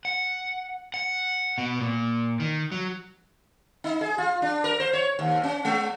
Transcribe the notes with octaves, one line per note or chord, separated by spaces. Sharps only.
F#5
F#5
B2
A#2
D#3
F#3
D#4
G#4
F4
D4
A#4
C5
C#5
D#2
C#4
G#3